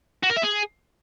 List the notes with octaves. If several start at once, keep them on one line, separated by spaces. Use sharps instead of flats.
F#4
A#4
E5
G#4